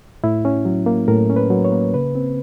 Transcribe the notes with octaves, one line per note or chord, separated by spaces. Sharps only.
A2 E4
C#4
F#3
A#3
A2 A#4
C#4
B4
F#3
C#5
A#3
C#3 B4
C4